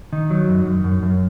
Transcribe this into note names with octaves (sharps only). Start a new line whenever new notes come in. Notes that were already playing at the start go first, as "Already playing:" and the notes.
D#3 D#4
F#3
F#2
F#2
F#2
F#2